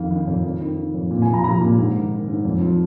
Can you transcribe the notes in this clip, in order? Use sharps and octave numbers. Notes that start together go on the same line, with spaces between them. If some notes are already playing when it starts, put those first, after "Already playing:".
Already playing: F2 D#3 F5
D#3
F2
F2
D#3
D#3
F2
A#2
G#5
F3
A#5
F3 A#5
A#2
G#2
D#3
D#3
G#2
F2
F3